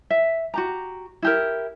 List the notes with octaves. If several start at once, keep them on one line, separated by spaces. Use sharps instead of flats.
E5
F#4 G4 A#5
E4 G4 A#4